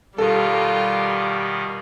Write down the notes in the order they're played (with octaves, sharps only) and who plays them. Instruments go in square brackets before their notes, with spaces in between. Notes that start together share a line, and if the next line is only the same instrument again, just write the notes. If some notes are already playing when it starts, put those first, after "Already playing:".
[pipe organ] B2 D#3 [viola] G3 [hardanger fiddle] F4 G4 [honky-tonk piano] A4